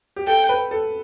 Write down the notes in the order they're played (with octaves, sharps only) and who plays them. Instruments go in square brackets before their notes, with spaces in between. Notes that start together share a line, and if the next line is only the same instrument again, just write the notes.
[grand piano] G4
[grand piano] A4 [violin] G5
[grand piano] B4
A4